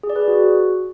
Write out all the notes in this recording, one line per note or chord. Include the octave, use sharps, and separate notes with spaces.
G#4
D5
B4
G#4
F#4